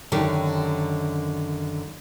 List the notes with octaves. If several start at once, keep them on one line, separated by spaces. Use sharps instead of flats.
F#2 D3 D#3 G4